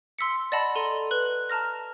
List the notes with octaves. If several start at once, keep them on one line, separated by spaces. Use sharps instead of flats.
C6 E6 B6 C#7
D5 D#5 F#5 A5 B5
A4 A#5 C6 D#7
B4 F#6 F#7
A5 A#5 F6 A#6